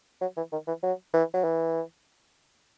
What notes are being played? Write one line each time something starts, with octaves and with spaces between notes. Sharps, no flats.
F#3
E3
D#3
E3
F#3
E3
F#3
E3